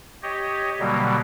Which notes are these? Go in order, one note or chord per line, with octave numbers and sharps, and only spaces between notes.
G4 C#5 D#5
B2 D3 F#3 G3 A#3